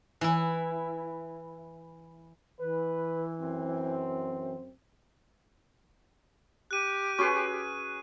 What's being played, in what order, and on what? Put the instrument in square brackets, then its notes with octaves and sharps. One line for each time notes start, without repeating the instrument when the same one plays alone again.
[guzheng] E3 E4
[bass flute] E3 [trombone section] B4
[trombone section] F#2 C4
[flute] G4 [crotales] F#6 D#7
[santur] C#4 G#4 B4 [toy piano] F#4 C#6